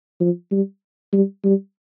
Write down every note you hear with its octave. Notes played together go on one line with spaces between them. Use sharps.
F3
G3
G3
G3